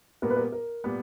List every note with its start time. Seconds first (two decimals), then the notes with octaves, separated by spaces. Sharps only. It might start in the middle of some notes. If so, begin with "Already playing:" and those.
0.22 A#2 G3 B3 A#4
0.30 B4
0.36 A#4
0.52 A#4
0.84 A#2 G3 B3